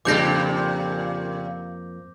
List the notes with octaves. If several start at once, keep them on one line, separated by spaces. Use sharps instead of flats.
F2 A#2 C#3 A#3 G4 D6 G6 A#6